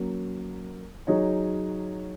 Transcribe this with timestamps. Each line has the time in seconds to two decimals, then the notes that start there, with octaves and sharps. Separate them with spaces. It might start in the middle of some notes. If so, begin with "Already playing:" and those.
Already playing: F#3 A#3 C#4
1.07 F#3 D#4 G#4 C#5